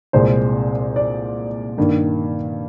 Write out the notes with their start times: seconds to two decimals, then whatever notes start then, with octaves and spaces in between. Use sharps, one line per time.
0.13 C2 A#2 G#3 C5
0.96 D5
1.78 G2 D#3 A#3